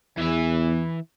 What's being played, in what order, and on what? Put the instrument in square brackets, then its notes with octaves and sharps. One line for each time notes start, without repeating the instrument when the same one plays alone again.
[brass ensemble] E2 [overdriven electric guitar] E3 E5